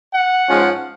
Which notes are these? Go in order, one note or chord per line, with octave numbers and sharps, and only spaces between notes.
F#5
G#2 F3 G#3 C#4 F4